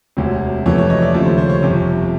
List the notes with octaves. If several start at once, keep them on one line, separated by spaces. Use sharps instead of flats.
E1 D2 C3 C#5
F2 C3 E3 A3 C#5
C#5
C#5 D#5
D5 E5
D#2 C#3 F3 A3 C#5
C5
C5
C#5
G1 F2 C3